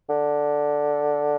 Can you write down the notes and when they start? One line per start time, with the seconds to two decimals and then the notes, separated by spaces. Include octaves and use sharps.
0.09 D3